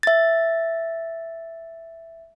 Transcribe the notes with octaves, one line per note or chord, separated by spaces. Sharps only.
E5 A6